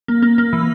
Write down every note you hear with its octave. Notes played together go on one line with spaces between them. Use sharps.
A#3
A#3
A#3
E3